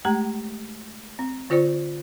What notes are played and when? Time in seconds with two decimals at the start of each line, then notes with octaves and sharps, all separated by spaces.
0.05 G#3 A3 G4 A#5
1.19 C4
1.50 D3 F4 C5 D5 C#6